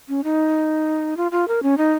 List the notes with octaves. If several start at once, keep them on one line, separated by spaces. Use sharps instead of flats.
C#4
D#4
F4
F4
A#4
C#4
D#4